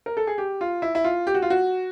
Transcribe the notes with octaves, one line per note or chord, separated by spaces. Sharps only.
A#4
A4
G#4
G4
F4
E4
E4
F4
G4
F#4
F4
F#4